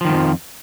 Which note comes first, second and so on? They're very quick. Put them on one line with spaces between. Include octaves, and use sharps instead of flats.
F3 D#3 G#2 F2